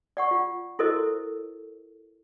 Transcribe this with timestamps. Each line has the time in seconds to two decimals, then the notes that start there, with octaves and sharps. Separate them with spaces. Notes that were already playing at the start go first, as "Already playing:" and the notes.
0.17 D5 F#5 C#6
0.31 F4
0.79 E4 F#4 A4 A#4 C5 D#5